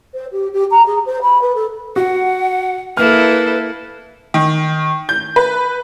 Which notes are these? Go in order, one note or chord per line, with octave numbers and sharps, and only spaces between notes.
C5
G4
G4
A#5
G#4
C5
B5
B4
A4
F#4 F#5
A#3 E4 A4 B4 F6
D#3
G6
B4